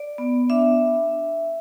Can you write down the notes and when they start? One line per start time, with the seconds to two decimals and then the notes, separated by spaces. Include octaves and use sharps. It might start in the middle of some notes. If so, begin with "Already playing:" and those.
Already playing: D5
0.18 B3
0.50 D4 E5